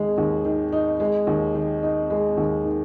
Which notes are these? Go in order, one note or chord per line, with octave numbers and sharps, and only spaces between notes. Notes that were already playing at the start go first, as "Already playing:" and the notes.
Already playing: D#2 D#3 G#3 D#4
D#2
D#3
D#4
G#3
D#2
D#3
D#4
G#3
D#2
D#3